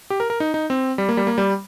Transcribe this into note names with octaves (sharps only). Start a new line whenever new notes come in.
G4
A#4
A#4
D#4
D#4
C4
G3
A#3
G3
A#3
G3